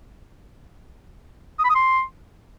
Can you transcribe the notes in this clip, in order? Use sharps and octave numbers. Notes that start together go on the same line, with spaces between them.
D#6
B5
D#6
C6